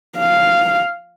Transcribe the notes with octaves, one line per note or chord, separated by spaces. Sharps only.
F5